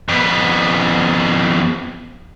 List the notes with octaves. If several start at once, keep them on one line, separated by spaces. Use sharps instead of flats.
F2 B3